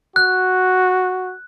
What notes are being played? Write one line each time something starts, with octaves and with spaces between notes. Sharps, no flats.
F#4 F#6